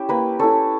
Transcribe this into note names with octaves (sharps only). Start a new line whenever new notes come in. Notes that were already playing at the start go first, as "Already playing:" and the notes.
Already playing: C#4 E4 G4
A#3 B4
C#4 E4 A4